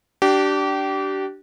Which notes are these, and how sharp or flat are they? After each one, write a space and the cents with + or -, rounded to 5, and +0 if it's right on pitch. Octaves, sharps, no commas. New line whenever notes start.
D4 +0 G4 -30